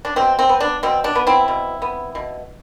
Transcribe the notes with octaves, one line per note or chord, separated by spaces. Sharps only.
D4
B2 C4
C4
B3
D4
B2 C4
D4
B3
C4 E4
B2
B3
B2